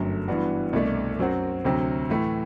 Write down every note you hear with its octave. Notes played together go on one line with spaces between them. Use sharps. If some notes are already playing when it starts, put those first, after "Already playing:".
Already playing: G1 F#2 F#3 A3
G2 E3 B3 D4 F#4
C2 B2 A3 D4
F#2 F#3 C4 F#4
D2 C3 F#3
A2 E3 A3